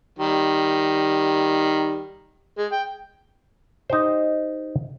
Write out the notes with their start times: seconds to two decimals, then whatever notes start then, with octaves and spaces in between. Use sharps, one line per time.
0.19 D#3 G3
2.58 G#3
2.72 G5
3.90 D#4 G4 C5